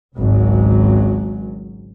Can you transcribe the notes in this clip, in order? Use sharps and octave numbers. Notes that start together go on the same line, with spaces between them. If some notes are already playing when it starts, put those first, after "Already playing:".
G#1 C#2 F#3 G#3